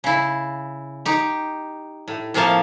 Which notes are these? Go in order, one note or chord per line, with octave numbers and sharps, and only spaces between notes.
C#3 E4
D#4 G4
A2
A2 C3 F3 A#3 F5 A5